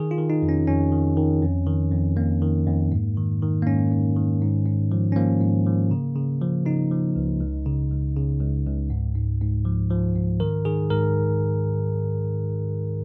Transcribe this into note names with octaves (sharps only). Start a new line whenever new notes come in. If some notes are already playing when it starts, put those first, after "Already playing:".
Already playing: D#3 G#4
F4
D#3
D#4
F2
C#4
F2 C#4
D#3
D#3
F2
D#3
F2
F2 A#3
D#3
F2
G#2
D#3
D#3
A#3
G#2 C#4
G#2
D#3
G#2
G#2
F3
C#4
F3 A#3
G#2
F3
C#3
C#3
F3
C#3 D#4
F3
C#2
C#2
C#3
C#2
C#3
C#2
C#2
G#2
G#2
G#2
F3
F3
G#2
D#3 A#4
D#3 G#4
G#2 A#4